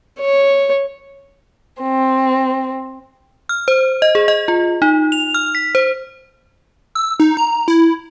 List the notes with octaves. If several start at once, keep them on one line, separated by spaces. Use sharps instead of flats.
C#5
C4
F6
C5
D#5
G#4
D#5
F4
D#4
F7
F6
B6
C5
E6
D#4
A#5
E4